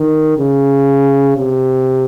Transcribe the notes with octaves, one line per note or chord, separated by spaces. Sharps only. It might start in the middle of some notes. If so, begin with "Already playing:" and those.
Already playing: D#3
C#3
C3